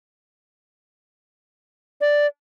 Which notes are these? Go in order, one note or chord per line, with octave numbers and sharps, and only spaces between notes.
D5